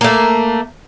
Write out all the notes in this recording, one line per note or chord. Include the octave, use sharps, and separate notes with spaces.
A3 A#3